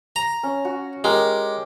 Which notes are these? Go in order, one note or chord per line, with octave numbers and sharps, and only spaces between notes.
A#5
C#4
F#4
G#3 G4 A#4